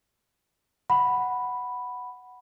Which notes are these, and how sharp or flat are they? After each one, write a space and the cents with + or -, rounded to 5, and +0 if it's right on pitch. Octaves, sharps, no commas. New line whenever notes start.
F#5 +0 B5 +0